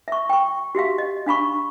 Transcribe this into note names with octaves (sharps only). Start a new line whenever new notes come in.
E5 C#6
G5 C#6
F#4 G4 E5 F5
D#5
D4 F5 B5 C#6